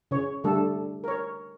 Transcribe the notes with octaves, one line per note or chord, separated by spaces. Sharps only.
C#3 C#5
D3 G3 A3 A4
A#4 C#5